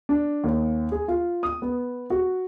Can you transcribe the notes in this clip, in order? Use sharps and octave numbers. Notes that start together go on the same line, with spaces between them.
D4
D#2
G#4
F4
D#6
B3
F#4